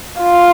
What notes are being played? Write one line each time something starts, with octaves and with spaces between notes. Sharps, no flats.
F4